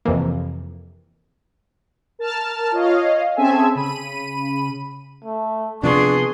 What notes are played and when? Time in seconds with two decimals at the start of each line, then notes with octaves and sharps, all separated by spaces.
0.05 F2 C3 E3 A#3
2.19 A#4 A5 F6
2.72 F4 C#5 D#5 F5
3.36 C4 C#4 G#4 A4 E5 G#5
3.75 C#3 B5 D#7
5.24 A3
5.83 C3 F3 B3 D4 G#4 C6 C#6